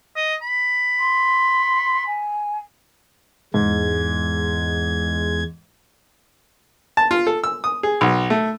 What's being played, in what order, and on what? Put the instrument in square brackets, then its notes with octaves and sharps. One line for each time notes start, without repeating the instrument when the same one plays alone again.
[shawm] D#5
B5
[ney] C6
G#5
[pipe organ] E2 G#3 G#6 [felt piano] G#2
[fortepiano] A5
F4
A4
E6
D#6
G#4
B1
A3